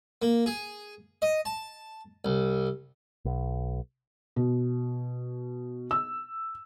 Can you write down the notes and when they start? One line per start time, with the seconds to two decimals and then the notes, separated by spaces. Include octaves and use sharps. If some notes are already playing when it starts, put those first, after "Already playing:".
0.22 A#3
0.46 G#4
1.22 D#5
1.45 A5
2.25 C2
3.25 B1
4.36 B2
5.91 E6